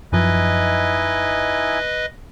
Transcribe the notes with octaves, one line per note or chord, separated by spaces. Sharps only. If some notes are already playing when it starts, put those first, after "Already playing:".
F#2 F3 D#4 E4 B4 D#5 G#5